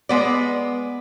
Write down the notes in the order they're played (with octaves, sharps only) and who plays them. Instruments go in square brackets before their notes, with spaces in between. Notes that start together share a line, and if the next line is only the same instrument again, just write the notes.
[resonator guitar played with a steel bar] G#3 B3 D5